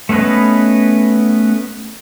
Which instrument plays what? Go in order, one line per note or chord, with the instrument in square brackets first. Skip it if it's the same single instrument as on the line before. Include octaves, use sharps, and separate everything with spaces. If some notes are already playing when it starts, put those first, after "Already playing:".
[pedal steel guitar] A3 B3 C#4 B4 D#5